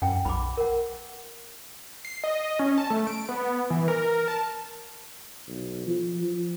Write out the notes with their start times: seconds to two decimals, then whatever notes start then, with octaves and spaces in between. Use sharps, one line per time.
0.02 F#2 F#5 G5
0.25 B1 B5 C6 D6
0.57 A#4 F#5
2.05 C7
2.24 D#5
2.59 C#4
2.78 A5
2.90 A3
3.07 D7
3.29 B3
3.70 E3
3.88 A#4
4.28 A5
5.48 B1
5.87 F3
6.21 F3